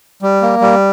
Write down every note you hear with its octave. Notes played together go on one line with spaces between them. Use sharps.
G3
A#3
G3